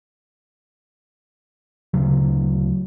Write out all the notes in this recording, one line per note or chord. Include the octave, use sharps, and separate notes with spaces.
D2 C#3 F#3